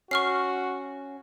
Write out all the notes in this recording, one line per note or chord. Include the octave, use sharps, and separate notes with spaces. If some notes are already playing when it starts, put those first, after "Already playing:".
C#4 F#4 C#6 F6 C7